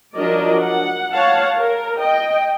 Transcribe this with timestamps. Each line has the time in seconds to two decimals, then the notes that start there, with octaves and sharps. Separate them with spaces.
0.15 F3 F#3 D4 A#4 D5 D#5
0.60 F#5
1.14 C#5 F5 F#5 A5
1.58 A#4
1.98 D#5 G5